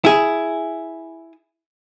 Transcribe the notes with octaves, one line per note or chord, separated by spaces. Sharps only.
E4 G#4